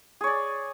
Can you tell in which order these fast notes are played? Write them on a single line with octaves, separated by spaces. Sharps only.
G#4 C#5 D5